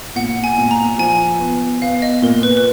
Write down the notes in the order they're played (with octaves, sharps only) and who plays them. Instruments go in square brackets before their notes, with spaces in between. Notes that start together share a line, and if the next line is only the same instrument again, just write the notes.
[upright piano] A#2 [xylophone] F#5
[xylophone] G#5
[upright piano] A#2
[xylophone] A#5
[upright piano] F3 [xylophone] G#5
[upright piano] B3
[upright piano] B3 [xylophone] F5
[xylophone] D#5
[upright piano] A#2 [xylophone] A#4
[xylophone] B4
B4